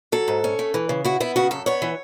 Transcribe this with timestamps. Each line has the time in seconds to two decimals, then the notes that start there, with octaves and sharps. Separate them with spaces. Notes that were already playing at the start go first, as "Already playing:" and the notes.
0.12 F#3 A4
0.28 G#2
0.44 C#4
0.59 A3
0.74 E3
0.89 C#3
1.04 E4 F#4
1.20 B3 E4
1.36 C#3 F#4
1.51 F#2 A4
1.66 B3 C#5
1.82 E3